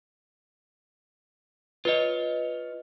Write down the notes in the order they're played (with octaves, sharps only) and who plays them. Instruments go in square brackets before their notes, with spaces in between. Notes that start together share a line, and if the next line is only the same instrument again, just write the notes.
[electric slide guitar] F4 C#5 [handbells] B4 D#5